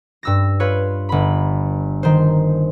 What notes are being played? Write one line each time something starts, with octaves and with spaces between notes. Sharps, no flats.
G2 E6 A#6
F4 B4 C#5
G1 B5
D#3 C5